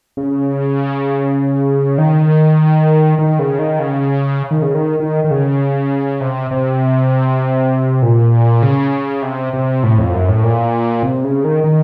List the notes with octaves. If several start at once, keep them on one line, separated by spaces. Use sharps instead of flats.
C#3
D#3
D#3
C#3
D#3
C#3
D#3
C#3
D#3
D#3
D#3
C#3
C3
C3
A#2
C#3
C3
C3
A2
F2
F#2
A2
A#2
C3
C#3
D#3
D#3